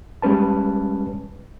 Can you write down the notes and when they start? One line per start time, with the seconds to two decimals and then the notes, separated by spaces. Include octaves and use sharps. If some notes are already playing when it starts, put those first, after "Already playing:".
0.22 G3 G#3 C#4 B4 A5